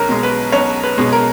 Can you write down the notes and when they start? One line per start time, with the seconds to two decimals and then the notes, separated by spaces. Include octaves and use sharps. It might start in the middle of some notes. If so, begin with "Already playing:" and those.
Already playing: B1 C#4 A#4
0.09 B2 G#3
0.23 B4
0.52 B1 C#4 C#5
0.84 B4
0.98 B2 G#3
1.13 A#4